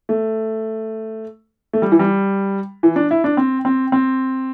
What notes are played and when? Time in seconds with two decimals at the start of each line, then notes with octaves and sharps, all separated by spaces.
0.09 A3
1.73 A3
1.82 G3
1.92 E3
1.99 G3
2.83 E3
2.96 D4
3.11 E4
3.24 D4
3.37 C4
3.65 C4
3.92 C4